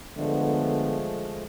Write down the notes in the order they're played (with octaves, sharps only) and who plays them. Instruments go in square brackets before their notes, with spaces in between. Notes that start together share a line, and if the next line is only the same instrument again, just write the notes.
[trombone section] D3 B3 [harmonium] F3 G#3 A3